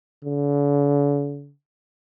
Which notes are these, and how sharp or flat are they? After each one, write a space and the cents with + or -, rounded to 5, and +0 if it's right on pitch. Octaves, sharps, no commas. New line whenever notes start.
D3 -45